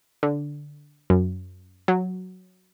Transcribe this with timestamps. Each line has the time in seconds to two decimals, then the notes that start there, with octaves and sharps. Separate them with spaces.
0.23 D3
1.10 F#2
1.88 F#3